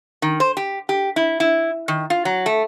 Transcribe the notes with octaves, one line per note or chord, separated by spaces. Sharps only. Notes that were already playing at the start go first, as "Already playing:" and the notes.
D#3
C5
G4
G4
E4
E4
D#3
F4
F#3
A3